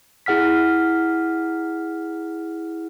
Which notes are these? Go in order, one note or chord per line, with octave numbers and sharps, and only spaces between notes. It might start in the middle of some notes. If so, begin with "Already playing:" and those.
E4 G#4 F#5 F6 B6